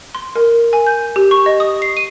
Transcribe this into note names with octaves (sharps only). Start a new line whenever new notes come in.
C6
A#4
G#5
G6
G4
C#6
D#5
D#6
C7
D#7